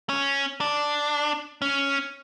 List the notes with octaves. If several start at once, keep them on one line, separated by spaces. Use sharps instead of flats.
C#4
D4
C#4